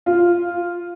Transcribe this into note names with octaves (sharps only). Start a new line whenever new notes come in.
F4